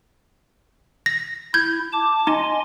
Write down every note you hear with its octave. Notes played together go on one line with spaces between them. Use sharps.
A#6
E4 G6 G#6
A5 D6
D#4 D#5 G#5 C6